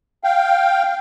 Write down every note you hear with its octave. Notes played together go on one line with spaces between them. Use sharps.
F5 G5